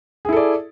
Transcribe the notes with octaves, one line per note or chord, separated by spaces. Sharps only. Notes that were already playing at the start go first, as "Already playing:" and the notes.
E4 G#4 A4 D5